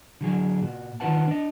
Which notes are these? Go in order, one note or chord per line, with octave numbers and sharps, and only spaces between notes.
D3 F#3 G#4
A#2 F#4
D#3 D#4 F4 B4 F#5 A5
D4 D#5